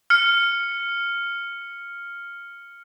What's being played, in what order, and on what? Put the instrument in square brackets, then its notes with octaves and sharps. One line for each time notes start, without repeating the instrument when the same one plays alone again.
[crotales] F6 C#7